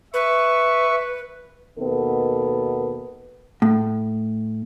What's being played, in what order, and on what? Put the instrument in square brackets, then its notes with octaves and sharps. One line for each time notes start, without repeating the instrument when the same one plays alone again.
[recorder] B4 [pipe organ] E5 C#6
[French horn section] D#2 B2 B3 A4 A#4
[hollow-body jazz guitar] A2